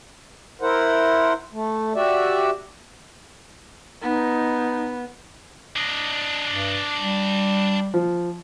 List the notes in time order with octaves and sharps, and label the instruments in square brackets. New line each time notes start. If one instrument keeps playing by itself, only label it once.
[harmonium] E4 A#4 C5 F#5
A3
F#4 G4 D5 E5
[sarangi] B3 [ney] D#4
[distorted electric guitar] D4 D#5
[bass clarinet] G2
G3
[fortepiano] F3